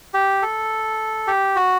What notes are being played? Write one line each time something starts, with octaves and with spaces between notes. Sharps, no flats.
G4
A4
G4
F#4